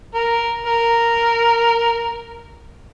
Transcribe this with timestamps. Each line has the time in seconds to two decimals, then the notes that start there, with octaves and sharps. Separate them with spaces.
0.15 A#4
0.67 A#4